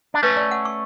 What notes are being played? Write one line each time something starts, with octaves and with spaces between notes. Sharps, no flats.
D4
A3 C#4 B4
D5
F#5
C#6